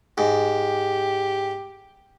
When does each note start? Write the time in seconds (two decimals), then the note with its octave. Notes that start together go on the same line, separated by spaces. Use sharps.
0.18 G#2 G4